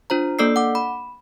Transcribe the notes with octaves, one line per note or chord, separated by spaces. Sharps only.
D4 F4 C5 A#5
A#3 D4 A4 D5 E6 C7
F#5 D6
B5